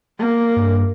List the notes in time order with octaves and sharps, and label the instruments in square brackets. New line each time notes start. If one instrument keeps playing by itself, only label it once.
[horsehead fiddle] A#3
[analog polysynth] G2